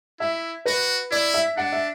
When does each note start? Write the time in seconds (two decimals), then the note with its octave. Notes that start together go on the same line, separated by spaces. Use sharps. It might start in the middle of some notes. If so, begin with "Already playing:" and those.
0.20 E4 E5
0.66 F#4 B4
1.11 E4 D5
1.34 E5
1.57 D4 F#5
1.73 E5